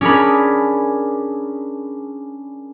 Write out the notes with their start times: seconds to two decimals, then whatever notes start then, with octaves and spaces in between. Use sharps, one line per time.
0.01 C#4 D4 G#4 A#4 B5